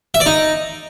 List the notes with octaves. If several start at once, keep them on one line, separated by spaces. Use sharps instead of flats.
E5
D5
D#4